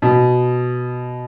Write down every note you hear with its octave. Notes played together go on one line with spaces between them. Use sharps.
B2